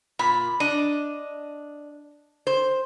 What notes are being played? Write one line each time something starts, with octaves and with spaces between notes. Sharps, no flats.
A#2 B5
D4 D#5
C5